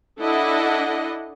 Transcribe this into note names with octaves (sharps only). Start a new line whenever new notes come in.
D4 E4 A4 D#5 F#5